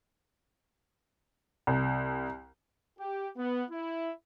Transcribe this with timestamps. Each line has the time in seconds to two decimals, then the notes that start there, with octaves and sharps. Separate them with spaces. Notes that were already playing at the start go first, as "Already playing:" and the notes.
1.67 C2
2.99 G4
3.36 B3
3.70 E4